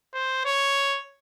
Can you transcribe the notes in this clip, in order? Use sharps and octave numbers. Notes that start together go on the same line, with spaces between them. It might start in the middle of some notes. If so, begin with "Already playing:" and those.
C5
C#5